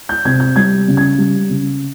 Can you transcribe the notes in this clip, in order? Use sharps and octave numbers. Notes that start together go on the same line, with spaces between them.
G6
C3 G#6
G6
G3 G#6
C#3
G#6
G3
C#3